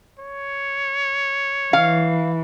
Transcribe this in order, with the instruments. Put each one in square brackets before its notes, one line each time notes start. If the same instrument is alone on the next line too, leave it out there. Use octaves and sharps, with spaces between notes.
[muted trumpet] C#5
[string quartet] E3 [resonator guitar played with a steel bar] F5